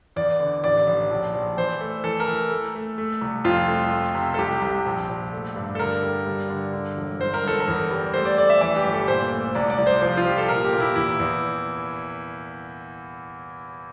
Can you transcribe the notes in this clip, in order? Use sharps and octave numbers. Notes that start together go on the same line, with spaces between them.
E2 D5
D3
A1 D5
A1
A#1
A#1
E3 C5
A3
E3 A4
A#4
E3
A3
A3
A3
C2
F2 F4
A3
A3
C3
A4
C2 G4
C2
A#1
A#1
A3
G2
A4
D3 A#4
G3
G2
D3
D3
E1
G1 C5
A#4
G1 A4
A#4
E2
G3
A3 C5
D5
A3 D5
E5
E3 D5
G4
G1
A4
A#2 C5
A3
C2 D5
D5
C2
C5
F3 C5
F4
F3 G4
A4
A#2 A#4
G4
A#2
E4
E2 E4
E2